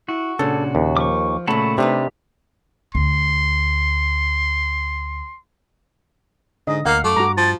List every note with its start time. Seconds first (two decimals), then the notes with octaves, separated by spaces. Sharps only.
0.09 E4 F#4
0.39 A#2 C#3 D4 A4
0.75 D#2
0.97 F3 C#6 D6
1.48 A#2 C#3 A3 F#4 A5 B5
1.78 C3 D4 D#4 G4 B4
2.95 D2 C6
6.67 G#2 D3 D#5
6.86 D2 A#3 F5 F#5 F6
7.04 F#2 A3 D6
7.16 G2 F#4 A#5
7.37 F3 A6